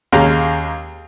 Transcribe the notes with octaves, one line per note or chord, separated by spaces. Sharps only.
D#2 G#3 C#4 F5 A#5